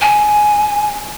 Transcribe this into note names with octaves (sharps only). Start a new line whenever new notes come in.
G#5